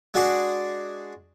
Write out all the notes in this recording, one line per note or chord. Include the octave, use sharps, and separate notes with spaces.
G#3 D4 F#4 G#4 D5